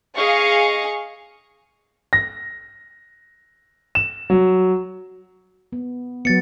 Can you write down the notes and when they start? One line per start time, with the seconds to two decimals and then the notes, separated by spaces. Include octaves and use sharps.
0.16 G#4 D#5 F5 C#6
2.13 A#6
3.95 E7
4.30 F#3
5.72 B3
6.25 F#3 B3 A6 C#7